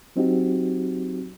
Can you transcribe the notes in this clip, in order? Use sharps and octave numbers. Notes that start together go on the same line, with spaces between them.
F#3 C4 D#4 F#4 G4